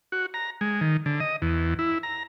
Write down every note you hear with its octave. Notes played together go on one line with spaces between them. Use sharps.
F#4
A#5
G#3
D#3
D3
D#5
E2
E4
A#5